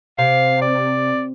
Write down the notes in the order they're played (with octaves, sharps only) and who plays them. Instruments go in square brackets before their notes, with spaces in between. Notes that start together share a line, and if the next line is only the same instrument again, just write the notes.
[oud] C3 [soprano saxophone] F5
[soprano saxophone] D5